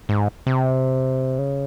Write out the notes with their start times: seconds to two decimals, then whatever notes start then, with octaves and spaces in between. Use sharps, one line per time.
0.09 G#2
0.47 C3
1.39 C#3